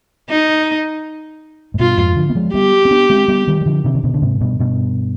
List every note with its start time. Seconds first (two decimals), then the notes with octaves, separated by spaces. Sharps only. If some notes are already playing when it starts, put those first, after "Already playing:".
0.30 D#4
1.74 G#2
1.79 G2 B2 F4
1.97 F2 G#2
2.16 D3 F3
2.30 B3
2.35 F3 G#3
2.54 G3 B3 G4
2.85 C4
2.91 B3 D4
3.10 G#3 C4
3.28 G3 B3
3.48 D#3 G3
3.61 G3
3.66 D3 F3
3.84 C3 D#3
3.95 D#3
4.04 B2 D3
4.14 D3
4.22 G#2 C3
4.41 G2 B2
4.60 G2 B2